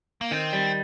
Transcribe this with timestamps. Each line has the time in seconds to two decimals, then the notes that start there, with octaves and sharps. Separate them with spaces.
0.21 A#3
0.31 D#3 C4
0.53 G3